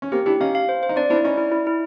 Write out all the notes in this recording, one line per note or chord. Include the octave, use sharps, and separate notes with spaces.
C#4
A#3 C4 G4
D4 E4 G4
C#4 D#4 F5
F5
C5
C5
D#4
C4 D4 D5
C4 D4 E4
C#4 D#4 D5
E4
E4
E4